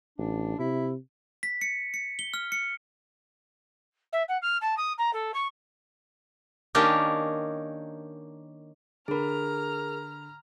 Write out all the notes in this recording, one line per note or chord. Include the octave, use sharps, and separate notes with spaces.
A1 D4
C3 E4
B6
C#7
C#7
G7
F6
C#7
E5
F#5
F6
A5
D#6
A#5
A4
C#6
D#3 A#3 C#4 D4 G4 A#4
D3 G#4 A#4 A#5 B5 F6